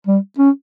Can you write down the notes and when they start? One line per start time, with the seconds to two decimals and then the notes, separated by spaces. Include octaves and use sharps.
0.07 G3
0.39 C#4